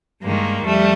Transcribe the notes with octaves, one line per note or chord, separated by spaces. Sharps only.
G2 D#3 G#3 A#3
F2 G3 A3